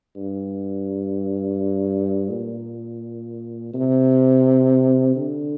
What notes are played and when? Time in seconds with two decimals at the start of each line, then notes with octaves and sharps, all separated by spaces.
0.16 G2
2.30 A#2
3.74 C3
5.15 D3